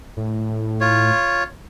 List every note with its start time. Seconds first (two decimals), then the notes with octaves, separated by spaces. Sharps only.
0.17 A2
0.81 F4 C#5